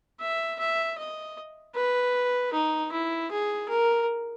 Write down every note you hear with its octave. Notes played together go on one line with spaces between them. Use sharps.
E5
E5
D#5
B4
D#4
E4
G#4
A#4